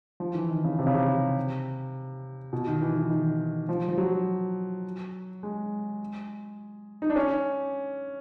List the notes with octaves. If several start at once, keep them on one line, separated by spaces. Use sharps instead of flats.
F3
E3
D#3
C#3
C3
C#3
C3
B2
D#3
E3
E3
D#3
F3
F3
F#3
G#3
D#4
D4
C#4